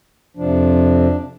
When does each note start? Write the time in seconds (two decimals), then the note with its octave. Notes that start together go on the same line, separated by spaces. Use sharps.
0.37 F2 C3 F3 D4